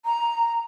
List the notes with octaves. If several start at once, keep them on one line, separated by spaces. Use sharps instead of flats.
A#5